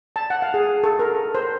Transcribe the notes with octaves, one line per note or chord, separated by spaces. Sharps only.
A5
F#5
F5
G#4
A4
A#4
C5